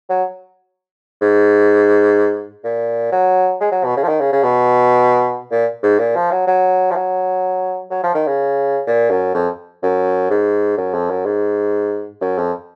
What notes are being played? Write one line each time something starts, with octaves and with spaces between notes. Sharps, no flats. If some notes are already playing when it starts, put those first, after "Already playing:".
F#3
G#2
A#2
F#3
G#3
F#3
B2
C#3
F3
D#3
C#3
C#3
B2
A#2
G#2
A#2
F3
F#3
F#3
F3
F#3
F#3
F3
D#3
C#3
A#2
F#2
F2
F#2
G#2
F#2
F2
F#2
G#2
F#2
F2